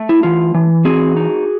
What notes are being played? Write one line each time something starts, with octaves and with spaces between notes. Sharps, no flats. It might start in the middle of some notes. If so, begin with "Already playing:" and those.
Already playing: A3
E4
E3 F4
E3
C4 F#4 G#4
D#4